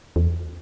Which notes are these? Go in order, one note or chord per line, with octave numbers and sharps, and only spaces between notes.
E2